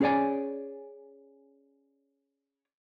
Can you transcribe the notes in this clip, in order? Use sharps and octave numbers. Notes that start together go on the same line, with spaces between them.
C#4 G#4 C#5 D5 G#5